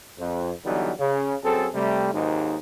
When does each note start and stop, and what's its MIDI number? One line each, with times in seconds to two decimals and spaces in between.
0.19 0.52 41
0.65 0.91 50
0.65 0.91 52
0.65 0.91 54
0.65 0.91 55
0.65 0.91 59
0.65 0.91 63
0.99 1.35 49
1.44 1.68 42
1.44 1.68 60
1.44 1.68 68
1.44 1.68 69
1.74 2.10 48
1.74 2.10 55
1.74 2.10 57
2.13 2.56 32
2.13 2.56 39
2.13 2.56 44
2.13 2.56 63